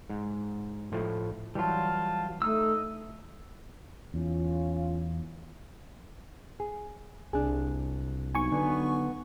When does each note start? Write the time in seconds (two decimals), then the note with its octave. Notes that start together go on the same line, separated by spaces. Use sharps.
0.10 G#2
0.92 A2 F3 A3
1.55 E3 F#3 G3 F4 A5
2.42 A3 D#4 D#6 E6
4.14 E2 C#4 F4
6.60 G#4
7.33 C2 D4 G#4
8.35 B1 G#5 C#6
8.52 D3 B3